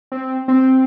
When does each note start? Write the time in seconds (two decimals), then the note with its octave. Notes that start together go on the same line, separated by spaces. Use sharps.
0.12 C4
0.48 C4